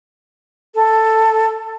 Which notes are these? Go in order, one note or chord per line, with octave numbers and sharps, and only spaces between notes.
A4